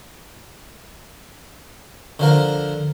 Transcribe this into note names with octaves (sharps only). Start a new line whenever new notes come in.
D3 F3 A#4